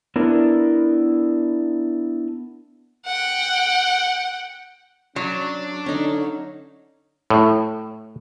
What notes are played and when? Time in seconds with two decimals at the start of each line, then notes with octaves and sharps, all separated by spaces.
0.16 B3 D4 E4 A#4 D5
3.06 F#5 G5
5.16 F#3 C#4 D4
5.86 D3 C#4 D#4
7.30 A2